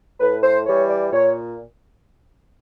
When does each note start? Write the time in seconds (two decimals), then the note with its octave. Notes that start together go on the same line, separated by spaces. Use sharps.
0.20 A2 B4
0.43 C5
0.66 E3 G3 C#5
0.89 D5
1.13 A#2 C#5